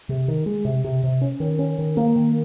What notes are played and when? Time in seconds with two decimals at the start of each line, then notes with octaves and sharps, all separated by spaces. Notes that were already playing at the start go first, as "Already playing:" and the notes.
0.09 C3
0.28 D#3
0.46 G#3
0.65 C3
0.84 C3
1.04 C3
1.21 C#4
1.40 D#3
1.59 C#4
1.78 D#3
1.97 A#3
2.16 D#3